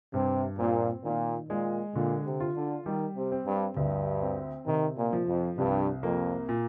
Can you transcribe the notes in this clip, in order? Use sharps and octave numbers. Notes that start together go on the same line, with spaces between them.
G2 C3
A#2 C4
A#2 D#3
A#2 G#3
A#2 D3
C3
F4
D3
D#3 G3
C3
C4
G2
D2 G2
C4
C3 D#3
A#2
F3
F2
C2 G2
F2 A#3
A#2